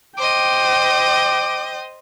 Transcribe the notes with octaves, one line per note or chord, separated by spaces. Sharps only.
C5 D#5 G5 D6